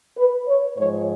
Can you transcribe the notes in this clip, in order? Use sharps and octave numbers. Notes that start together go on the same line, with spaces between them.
B4
C#5
G#2 F3 C#5